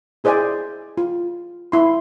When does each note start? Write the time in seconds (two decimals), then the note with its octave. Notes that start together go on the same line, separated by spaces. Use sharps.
0.24 E4 G#4 C5 D5 E5 G#5
0.98 F4
1.72 E4 C6